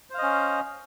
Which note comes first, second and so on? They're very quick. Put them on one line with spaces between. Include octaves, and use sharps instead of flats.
C5 F5 D#5 C#4